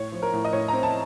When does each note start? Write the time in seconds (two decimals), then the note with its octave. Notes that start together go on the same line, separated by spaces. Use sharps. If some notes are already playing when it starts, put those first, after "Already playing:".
Already playing: A2 C#5
0.12 F3
0.22 A#4
0.33 A2
0.45 D#5
0.53 A2 C#5
0.68 C4 A#5
0.83 A5